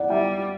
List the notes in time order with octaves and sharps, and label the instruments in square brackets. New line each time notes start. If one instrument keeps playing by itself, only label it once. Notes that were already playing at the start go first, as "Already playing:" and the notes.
Already playing: [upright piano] D5 F#5
[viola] G3 [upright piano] E5 G5